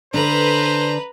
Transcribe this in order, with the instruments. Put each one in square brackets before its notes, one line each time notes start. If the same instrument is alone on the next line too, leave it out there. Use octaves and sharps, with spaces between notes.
[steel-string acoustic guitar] D3 D4 [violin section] B4 [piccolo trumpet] C5 [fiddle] A#5